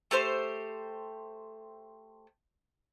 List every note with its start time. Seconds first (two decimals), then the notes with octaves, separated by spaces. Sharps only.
0.11 A3 G4 C5